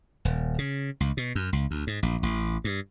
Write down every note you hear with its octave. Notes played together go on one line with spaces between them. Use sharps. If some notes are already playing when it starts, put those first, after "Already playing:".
D#1
C#3
C#2
B2
F#2
C#2
D2
G#2
A#1
A1
G2